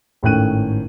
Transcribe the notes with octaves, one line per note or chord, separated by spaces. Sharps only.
G#1 A2 C#4 G5 F#6 D#7